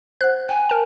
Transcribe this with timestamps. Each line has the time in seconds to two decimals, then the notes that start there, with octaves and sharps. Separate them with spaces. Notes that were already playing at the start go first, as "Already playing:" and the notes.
0.21 C5 F#5 F#6
0.49 G5 G#5
0.69 A#4 A5